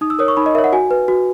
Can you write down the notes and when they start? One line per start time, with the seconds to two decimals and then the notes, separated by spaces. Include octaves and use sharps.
0.01 D#4 D#6
0.10 E6
0.19 A#4 C#5 D#6
0.28 C#6
0.37 D#4 B5
0.46 D#5
0.55 A#4 C#5 E5
0.64 F#5
0.72 F#4 G#5
0.91 B4
1.08 F#4